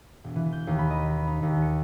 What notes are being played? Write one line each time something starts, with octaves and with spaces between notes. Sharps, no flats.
E1
E3
G6
D#2
B5
D#5
B5
D#4
D#2
C#7